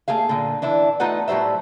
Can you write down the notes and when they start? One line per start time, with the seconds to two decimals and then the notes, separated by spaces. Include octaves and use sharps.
0.08 A3 A#3 G#4 F5
0.29 A#2 D3
0.62 E3 D4 E4
1.00 A3 D#4 F4 B4 F#5
1.28 A2 F#3 G3 C5 E5